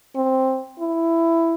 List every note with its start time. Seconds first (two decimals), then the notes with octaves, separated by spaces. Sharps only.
0.16 C4
0.80 E4